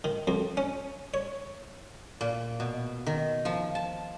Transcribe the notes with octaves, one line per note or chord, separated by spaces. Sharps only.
D#3
F2
C#4
C#5
A#2
B2
D#3
F3
A5